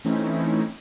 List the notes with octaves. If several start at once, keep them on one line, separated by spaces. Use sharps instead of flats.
E3 A3 C4 C#4 D#4 E4